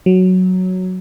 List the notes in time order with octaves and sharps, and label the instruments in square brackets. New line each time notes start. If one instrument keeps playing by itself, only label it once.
[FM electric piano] F#3